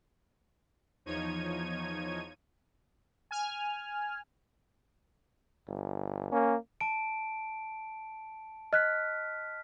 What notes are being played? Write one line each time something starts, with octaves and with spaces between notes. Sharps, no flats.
E2 F3 D#4 C#5 G#6 D#7
G#5 F6
G1
A#3 C#4
A5 D7
D#5 F6 F#6 B6